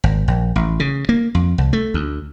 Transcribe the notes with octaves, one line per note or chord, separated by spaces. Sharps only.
G#1
A#1
A1
C#3
A#3
F2
C2
A3
D2